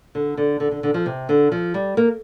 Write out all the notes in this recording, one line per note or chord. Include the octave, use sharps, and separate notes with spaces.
D3
D3
D3
D3
D3
F3
C3
D3
F3
G3
A#3